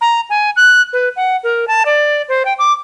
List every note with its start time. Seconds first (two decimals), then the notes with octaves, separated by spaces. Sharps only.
0.01 A#5
0.30 G#5
0.56 F#6
0.93 B4
1.16 F#5
1.44 A#4
1.68 A5
1.86 D5
2.29 C5
2.45 G5
2.59 D6